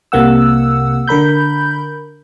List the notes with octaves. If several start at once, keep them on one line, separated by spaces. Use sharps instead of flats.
C2 C3 A#3 F#5 E6
D3 A#4 B5 G6